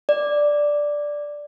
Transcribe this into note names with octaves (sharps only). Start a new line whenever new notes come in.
D5